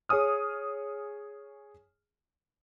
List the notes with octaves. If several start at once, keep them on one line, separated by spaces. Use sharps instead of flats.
G#4 C#5 G#5 D#6 F6